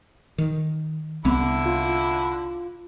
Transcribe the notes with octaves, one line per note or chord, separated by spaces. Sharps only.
D#3
C2 D3 B3 E4
F4